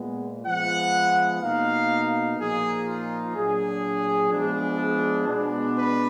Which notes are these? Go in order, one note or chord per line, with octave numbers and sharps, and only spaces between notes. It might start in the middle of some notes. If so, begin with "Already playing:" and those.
Already playing: A#2 G#3 B3
F3 G#3 B3 F#5
B2 A#3 D#4 F5
A#2 F3 A#3 D#4 G#4
F4
A#2 F#3 D4 G#4
F3 G#3 B3 D4
G#4
B2 G#3 B3 D4
B4